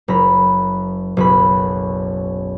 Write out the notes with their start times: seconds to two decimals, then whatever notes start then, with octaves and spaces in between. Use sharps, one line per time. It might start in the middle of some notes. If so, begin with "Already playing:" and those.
0.08 F#1 A#5 B5
1.17 F#1 B1 B5